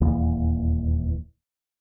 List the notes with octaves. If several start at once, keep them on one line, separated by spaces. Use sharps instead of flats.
D#1 E2 E3 A#3